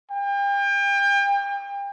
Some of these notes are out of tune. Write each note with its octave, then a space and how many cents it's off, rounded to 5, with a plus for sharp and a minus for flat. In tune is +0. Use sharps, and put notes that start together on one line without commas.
G5 +35